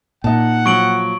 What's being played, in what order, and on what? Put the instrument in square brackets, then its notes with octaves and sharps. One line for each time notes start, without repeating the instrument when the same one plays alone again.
[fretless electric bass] A#2 [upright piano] D#4 A5 [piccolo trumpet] F#5
[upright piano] F3 F#3 [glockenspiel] C#6 D7 F#7